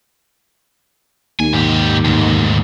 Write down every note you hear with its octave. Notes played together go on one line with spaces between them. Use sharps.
D#2 G#5
G#2 G4
D2 G#2